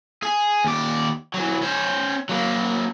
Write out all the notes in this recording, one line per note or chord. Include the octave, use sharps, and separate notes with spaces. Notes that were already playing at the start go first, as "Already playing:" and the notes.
G#4
D#2 D5
E3 F#3
C#4 C5
F#3 A#3